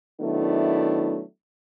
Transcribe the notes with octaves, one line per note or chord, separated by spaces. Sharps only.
D#3 F#3 A3 B3 D4 E4